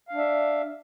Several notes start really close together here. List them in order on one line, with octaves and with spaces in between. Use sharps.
F5 D4 E5